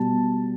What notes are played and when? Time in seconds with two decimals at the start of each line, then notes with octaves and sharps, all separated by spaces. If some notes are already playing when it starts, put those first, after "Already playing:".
Already playing: B2 G3 A5